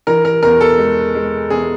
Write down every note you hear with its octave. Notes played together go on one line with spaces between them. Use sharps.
E3 A#4
A#4
E2 A#4
A4
G#3
G#3
E2 G#4